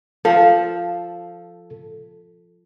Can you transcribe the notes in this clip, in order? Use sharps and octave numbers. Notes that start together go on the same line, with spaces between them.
F3 A4